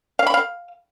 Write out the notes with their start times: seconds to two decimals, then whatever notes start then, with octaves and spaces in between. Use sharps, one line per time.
0.19 F5
0.27 B5
0.34 F5